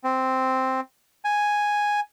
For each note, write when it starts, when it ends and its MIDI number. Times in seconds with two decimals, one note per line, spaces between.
0.04 0.80 60
1.25 2.00 80